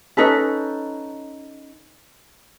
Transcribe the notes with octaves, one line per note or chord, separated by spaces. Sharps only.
C#4 D#4 A4 B4